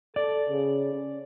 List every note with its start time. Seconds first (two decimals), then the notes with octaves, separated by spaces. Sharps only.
0.16 A4 D5
0.49 C#3
0.92 C#4